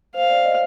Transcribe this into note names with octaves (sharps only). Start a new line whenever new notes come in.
C5 F5
D5
D#5